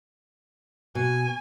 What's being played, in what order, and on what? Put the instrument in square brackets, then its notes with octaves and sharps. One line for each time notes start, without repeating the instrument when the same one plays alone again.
[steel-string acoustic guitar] B2 [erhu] G#5